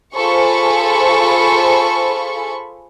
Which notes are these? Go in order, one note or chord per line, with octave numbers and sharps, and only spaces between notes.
F4 G#4 A4 C5 B5 C#6